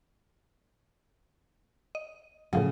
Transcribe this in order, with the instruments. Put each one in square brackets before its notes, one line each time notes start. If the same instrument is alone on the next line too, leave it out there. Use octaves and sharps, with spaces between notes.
[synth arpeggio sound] D#5
[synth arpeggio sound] A2 F3 F#3 [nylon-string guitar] C#3